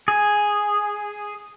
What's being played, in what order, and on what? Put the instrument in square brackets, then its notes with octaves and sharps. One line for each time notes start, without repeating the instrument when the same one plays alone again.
[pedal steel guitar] G#4